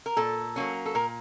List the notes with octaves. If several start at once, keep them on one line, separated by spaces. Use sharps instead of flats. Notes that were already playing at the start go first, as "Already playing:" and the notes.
A#4
A#2 A4
F#3 A#3 C#4
A4
A#2 A#4